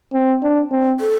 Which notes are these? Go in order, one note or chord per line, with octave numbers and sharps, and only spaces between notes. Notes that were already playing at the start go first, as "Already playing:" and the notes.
C4
D4
C4
A4